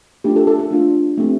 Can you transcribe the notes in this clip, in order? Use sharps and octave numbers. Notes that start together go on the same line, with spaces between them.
A3 D4 F4 G4
A4
A4
A4
A3 D4 F4
A3 C4 G4